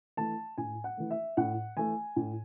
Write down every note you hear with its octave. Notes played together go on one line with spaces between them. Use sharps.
E3 A3 A5
A2 G#5
F#5
E3 A3
E5
A2 F#5
E3 A3 G#5
A2